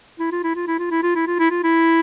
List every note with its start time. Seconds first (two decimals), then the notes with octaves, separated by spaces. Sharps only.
0.19 E4
0.32 F4
0.44 E4
0.55 F4
0.68 E4
0.79 F4
0.91 E4
1.03 F4
1.15 E4
1.27 F4
1.39 E4
1.51 F4
1.64 E4